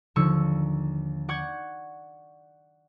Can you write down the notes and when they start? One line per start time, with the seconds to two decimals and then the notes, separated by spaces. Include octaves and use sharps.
0.16 D#2 D3 F3 C#6 E6
1.28 D5 F#5 C#6 G6 G#6